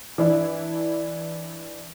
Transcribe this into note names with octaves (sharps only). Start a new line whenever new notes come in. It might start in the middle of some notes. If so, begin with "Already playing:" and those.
E3 D4 E4